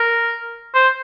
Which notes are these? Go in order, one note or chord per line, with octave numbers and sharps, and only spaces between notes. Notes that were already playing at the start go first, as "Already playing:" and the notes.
Already playing: A#4
C5